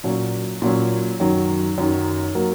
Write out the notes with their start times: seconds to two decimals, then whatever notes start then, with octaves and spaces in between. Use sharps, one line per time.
0.04 A#2 F#3 C#4
0.62 A#2 F#3 C#4
1.20 F#2 D#3 F#3
1.78 F#2 D#3 F#3
2.35 F#3 A#3